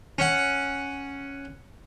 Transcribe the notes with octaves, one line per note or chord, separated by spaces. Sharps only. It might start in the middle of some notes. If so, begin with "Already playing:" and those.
C#4 F#5